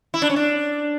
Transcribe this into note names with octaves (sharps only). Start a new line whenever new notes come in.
E4
D4
C#4
D4